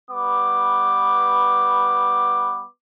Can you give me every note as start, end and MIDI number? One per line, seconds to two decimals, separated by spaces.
0.11 2.64 55
0.11 2.64 59
0.11 2.64 71
0.11 2.64 86